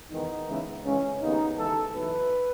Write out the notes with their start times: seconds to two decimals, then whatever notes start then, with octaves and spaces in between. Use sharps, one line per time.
0.11 E2 D#3 G#3 B3 D#4
0.47 C#2 C#3 E3 G#3 B3
0.84 C#2 C#3 E3 G#3 C#4
1.20 D#2 C#3 G#3 B3 D#4
1.57 D#2 C#3 E3 G#3 A4
1.93 B1 A2 E3 B4